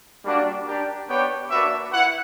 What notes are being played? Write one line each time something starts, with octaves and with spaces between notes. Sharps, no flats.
G3 A#3 D4 F#4
D4 G4 A#4
B3 D4 G4 C#5 G5
A#3 D4 F#4 B4 E5
E4 B4 F#5